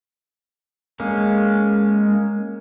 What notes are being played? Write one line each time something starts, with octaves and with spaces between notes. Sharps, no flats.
G#3 A#3 C#4